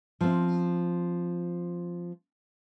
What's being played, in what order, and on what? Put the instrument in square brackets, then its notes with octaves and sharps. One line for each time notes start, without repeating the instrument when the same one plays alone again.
[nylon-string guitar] F3 C4